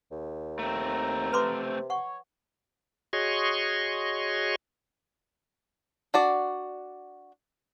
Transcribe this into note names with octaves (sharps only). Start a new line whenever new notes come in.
D#2
A3 C4 A#5
C3 B4 C6 D6
C#5 F#5 C#6
F#4 G#4 C#5 D#5 C6 C#6
D4 F#4 D5